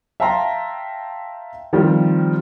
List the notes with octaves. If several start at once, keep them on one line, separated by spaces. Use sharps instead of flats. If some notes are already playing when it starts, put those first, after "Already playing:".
E5 F5 G5 A5 A#5 C6
D#3 F3 G3 C4